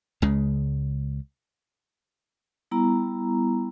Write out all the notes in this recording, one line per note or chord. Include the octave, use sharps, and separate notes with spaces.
C#2 C#3 G#3
G3 B3 E4 A#5